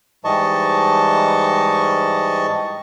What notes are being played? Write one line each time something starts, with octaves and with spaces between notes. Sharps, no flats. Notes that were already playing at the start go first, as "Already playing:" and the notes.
G#2 E3 G3 D#5 A5 C#6